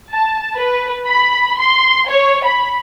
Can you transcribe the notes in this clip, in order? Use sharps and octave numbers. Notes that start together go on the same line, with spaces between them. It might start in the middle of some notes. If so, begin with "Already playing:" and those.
A5
B4
B5
C6
C#5
B5